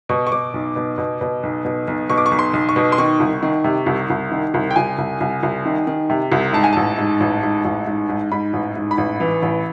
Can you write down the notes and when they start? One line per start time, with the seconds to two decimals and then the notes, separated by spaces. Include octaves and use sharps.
0.09 B2 C#6
0.27 C#6
0.31 B2 D6
0.54 B1
0.76 B2
0.98 B2
1.21 B2
1.43 B1
1.65 B2
1.88 B1
2.09 B2 C#6
2.18 D6
2.26 C#6
2.31 B1
2.39 C6
2.53 B1
2.69 C#6
2.76 B2
2.92 C6
2.98 D#3 C#6
3.20 C2
3.42 D#3
3.64 C3
3.86 C2
4.10 C2
4.31 D#3
4.54 C2
4.71 G5
4.76 C2 G#5
4.98 C2
5.20 C2
5.43 C2
5.65 D#3
5.87 D#3
6.10 C3
6.32 C2
6.53 G#2 A5
6.64 G#5
6.73 A1 A5
6.98 G#2
7.20 A1
7.43 G#2
7.64 A1
7.87 G#2
8.09 G#2
8.31 G#2 B5
8.53 A1
8.76 G#2
8.91 B5
8.98 A1
9.20 E3
9.42 A1